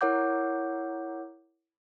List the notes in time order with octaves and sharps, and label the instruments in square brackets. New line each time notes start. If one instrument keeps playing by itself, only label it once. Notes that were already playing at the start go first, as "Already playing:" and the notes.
[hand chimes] E4 A#4 C#5 F#5 D6 G6